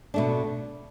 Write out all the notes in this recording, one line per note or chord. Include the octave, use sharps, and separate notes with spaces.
B2 A3 D4